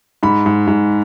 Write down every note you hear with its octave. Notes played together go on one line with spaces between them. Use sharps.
G#2 B5
G#2
G#2